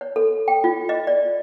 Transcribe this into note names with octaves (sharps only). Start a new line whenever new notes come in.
C#5
A4
G5
F4
D#5
D5